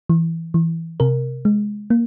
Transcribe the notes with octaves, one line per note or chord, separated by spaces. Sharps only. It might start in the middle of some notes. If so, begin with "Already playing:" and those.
E3
E3
C3 A#4
G#3
A#3